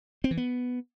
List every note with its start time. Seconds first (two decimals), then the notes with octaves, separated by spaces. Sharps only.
0.24 C4
0.31 E3
0.37 B3